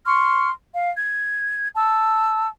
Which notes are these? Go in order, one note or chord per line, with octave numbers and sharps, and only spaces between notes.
C6 C#6 F6
F5
G#6
A5 E6